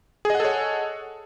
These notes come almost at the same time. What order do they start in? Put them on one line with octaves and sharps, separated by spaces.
G#4 D#5 F#5 A4 C#5